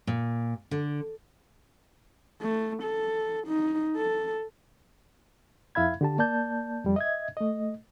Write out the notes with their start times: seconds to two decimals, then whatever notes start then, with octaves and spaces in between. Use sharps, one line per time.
0.07 A#2
0.71 D3
2.42 A3
2.83 A4
3.48 D#4
3.97 A4
5.75 F2 E4 E5 F5 B5 G#6
6.01 D3 G4 A5
6.18 A#3 D5 A5 G6
6.84 F2 G3
6.96 D#5 E5 G#6
7.37 A3 D#5